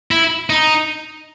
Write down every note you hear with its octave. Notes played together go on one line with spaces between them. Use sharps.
E4
D#4